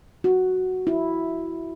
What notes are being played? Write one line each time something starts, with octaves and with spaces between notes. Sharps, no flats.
F#4
E4